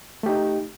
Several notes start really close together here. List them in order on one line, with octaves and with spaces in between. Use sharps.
A3 G4 D#4